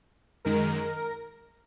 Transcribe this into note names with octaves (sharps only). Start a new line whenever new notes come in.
F#2 D#3 G#3 A#4